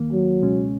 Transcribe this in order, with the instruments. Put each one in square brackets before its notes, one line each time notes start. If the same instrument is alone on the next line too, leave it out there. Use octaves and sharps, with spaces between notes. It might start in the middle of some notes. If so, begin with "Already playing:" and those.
Already playing: [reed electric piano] D#2 D#3 A#3
[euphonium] F#3
[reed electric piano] C#2 B2 G#3 C#4